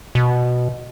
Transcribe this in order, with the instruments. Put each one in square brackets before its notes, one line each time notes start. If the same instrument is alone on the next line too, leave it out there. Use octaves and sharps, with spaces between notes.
[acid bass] B2